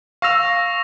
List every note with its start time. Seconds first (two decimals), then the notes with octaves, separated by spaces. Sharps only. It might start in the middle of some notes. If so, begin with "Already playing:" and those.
0.22 F5 C#6 E6 A#6 F7